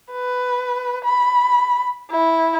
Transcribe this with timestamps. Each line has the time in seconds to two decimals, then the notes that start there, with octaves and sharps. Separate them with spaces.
0.12 B4
1.05 B5
2.11 E4